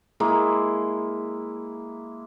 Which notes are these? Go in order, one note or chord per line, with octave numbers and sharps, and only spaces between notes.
G#3 A#3 E4